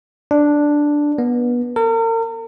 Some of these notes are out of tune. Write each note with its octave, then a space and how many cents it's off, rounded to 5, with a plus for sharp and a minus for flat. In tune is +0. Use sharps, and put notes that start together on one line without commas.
D4 +0
B3 -25
A#4 -40